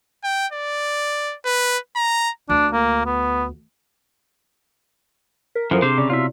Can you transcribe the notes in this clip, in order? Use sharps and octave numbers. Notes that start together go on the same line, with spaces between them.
G5
D5
B4
A#5
D2 D4
A#3
B3
A#4 B6
F#2 E3 F3 A4 A#4 C5
C3 D4 G#4 C5 D6
C#3 D5
B2 E4 F4 C#5 D5 E5